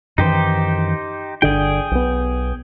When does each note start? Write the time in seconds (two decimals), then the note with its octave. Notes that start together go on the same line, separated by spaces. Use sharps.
0.18 F#2 D#3 E3 D#4 G4 C5
1.42 G1 D3 D4 G#4 G5
1.91 B1 B3